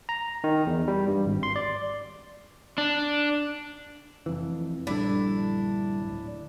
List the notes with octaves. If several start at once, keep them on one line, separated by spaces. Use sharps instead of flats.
A#5
D#3
E2
G3
G2
G#1
C6
D5
D4
F1 F2 E3
A#1 G2 D3 D4 E4
D1